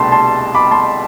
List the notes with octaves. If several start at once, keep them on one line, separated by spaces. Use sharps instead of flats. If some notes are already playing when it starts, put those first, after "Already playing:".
Already playing: C2 B2 A3 D4 G5 A5 B5 C6
A5 C6
B5 D6
A5 C6